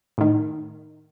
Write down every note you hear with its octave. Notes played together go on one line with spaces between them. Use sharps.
A2 D#3